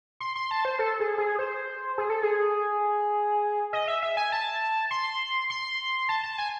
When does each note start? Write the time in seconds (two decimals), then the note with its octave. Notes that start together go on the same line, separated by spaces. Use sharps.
0.20 C6
0.36 C6
0.51 A5
0.65 C5
0.79 A4
1.00 G#4
1.18 G#4
1.39 C5
1.98 G#4
2.10 A4
2.23 G#4
3.73 D#5
3.88 E5
4.02 E5
4.17 G#5
4.32 A5
4.91 C6
5.50 C6
6.09 A5
6.23 A5
6.38 G#5